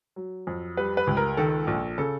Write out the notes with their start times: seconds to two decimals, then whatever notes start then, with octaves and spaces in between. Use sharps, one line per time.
0.16 F#3
0.47 F2
0.77 G3 B4
0.97 B4
1.07 C#2
1.17 A#4
1.37 D#3 A4
1.67 A#1
1.98 C#3 A4